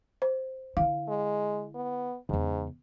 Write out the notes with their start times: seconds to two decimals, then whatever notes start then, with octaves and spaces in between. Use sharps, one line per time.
0.22 C5
0.77 D3 E4 F5
1.08 G#3
1.75 B3
2.29 E2 G#2 C#3